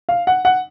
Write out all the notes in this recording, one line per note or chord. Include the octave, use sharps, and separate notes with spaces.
F5
F#5
F#5